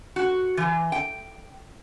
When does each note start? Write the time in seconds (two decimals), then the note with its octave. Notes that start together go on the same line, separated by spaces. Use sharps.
0.16 F#4
0.57 E3
0.92 G5